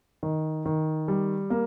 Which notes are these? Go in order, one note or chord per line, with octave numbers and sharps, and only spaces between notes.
D#3
D#3
G3
A#3